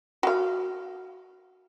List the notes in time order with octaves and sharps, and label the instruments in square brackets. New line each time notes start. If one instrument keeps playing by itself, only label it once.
[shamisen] F#4 F5